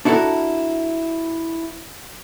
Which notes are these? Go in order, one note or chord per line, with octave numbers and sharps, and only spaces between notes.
D4 E4 F#4 A4 A#4